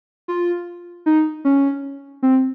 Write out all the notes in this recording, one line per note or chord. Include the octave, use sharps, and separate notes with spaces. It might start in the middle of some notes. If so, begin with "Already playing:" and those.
F4
D#4
C#4
C4